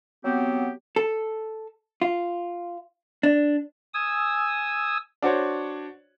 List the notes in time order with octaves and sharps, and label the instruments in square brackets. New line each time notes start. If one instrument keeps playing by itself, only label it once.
[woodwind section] F#3 B3 C4 G4
[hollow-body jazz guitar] A4
F4
D4
[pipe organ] G#5 D#6 E6
[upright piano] D4 F#4 C5 C#5